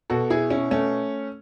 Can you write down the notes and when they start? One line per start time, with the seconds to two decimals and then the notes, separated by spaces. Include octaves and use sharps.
0.10 B2 F#4 A4
0.30 E4 G#4
0.50 C#4 E4
0.71 A3 C#4